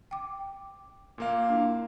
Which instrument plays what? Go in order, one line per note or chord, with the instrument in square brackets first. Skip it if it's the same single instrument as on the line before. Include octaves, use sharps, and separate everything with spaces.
[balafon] G5 D6
[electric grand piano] A#2 A#3 F5
[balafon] D4 E4